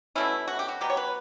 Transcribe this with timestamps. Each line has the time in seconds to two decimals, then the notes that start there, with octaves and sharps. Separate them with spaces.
0.15 B2 A3 C#4 E4
0.48 F#4
0.59 G4
0.68 F#4
0.81 B2 F#3 B3 G4
0.90 C#5
0.97 B4